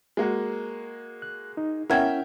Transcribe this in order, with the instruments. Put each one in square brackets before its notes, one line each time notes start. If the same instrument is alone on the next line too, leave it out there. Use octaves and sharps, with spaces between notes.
[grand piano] G#3 A#3 F#4
[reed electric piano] F#6
D#4
[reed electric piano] C#4 E4 [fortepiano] A#4 E5 G5 [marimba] F#5 G#6